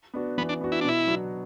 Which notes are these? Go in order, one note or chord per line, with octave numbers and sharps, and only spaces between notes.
B3 D4 F#4
E3 B3
D4
B3 D4 F#4
E4
D4
B2 E4
F#3 B3 D4 F#4